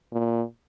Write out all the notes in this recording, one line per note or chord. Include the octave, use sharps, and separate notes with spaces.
A#2